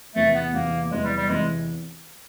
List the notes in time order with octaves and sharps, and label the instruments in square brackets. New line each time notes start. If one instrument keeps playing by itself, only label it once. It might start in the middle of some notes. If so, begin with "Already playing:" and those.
[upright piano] E2 C3 E3 [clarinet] A3
[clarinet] B3
[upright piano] E2 C3 E3 [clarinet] A#3
[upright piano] E2 C3 E3 [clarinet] G#3
[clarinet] G3
G3
[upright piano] E2 C3 E3 [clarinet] G#3